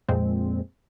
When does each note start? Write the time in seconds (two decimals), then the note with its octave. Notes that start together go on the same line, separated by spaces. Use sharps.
0.09 F2 A#2 G#3 C4